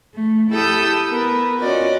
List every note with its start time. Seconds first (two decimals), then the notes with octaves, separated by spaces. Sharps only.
0.15 A3
0.53 E4 G4 A4 D#6 E6 G6
1.09 B3 A#4 B4
1.61 C#4 F4 F#4 D5 D#5